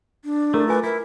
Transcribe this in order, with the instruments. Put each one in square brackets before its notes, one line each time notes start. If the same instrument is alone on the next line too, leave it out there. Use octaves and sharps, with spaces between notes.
[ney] D4
[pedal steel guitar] A3 [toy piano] E4 A#4
[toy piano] F4 G#5 D6 [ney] B4
[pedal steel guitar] E4 [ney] A#4